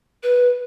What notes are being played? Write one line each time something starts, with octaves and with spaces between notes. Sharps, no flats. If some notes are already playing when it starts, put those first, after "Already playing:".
B4